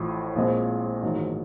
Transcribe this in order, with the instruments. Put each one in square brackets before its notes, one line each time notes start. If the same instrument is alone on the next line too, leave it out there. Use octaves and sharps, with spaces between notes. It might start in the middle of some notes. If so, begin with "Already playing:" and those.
Already playing: [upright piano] A1 A2 F3
A#1 A#2 F3 G#3 C4
A1 G#2 D#3 F#3